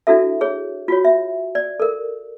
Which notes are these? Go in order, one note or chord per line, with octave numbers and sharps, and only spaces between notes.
D4 E4 F#4 A4 E5
G#4 C#5
F4 F#4 C#5
E5
D5
A4 A#4